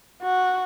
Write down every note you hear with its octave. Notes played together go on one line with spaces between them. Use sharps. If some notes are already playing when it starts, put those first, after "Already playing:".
F#4